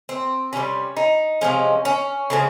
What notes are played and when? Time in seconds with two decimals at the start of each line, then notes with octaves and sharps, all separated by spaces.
0.09 C4
0.53 C3 D#3 G3 C#4
0.97 D#4
1.41 C3 F3 G#3 C#4
1.85 C#4
2.30 C#3 F3 G#3